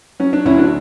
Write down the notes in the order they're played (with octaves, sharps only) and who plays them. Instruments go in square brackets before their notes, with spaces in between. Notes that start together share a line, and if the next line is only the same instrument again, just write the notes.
[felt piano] F#3 C#4
D4
D2 C#4 E4
D4 F#4